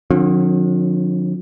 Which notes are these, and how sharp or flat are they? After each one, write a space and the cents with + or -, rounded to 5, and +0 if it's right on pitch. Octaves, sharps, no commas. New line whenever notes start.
D3 +35 F3 +45 C#4 -30